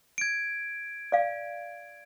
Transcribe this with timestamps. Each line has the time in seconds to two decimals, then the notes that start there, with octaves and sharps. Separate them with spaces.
0.18 G#6 D7
1.12 D5 F5